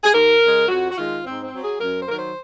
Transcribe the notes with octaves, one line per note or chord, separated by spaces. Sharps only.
G#4
D#2 A#4
C#3 G#3
F2 F#4
F#4
D#3 G#3 F4
G#2 C4
C4
F#3
G#4
F#2 A#4
C5
D#3 F#3 A#4
C5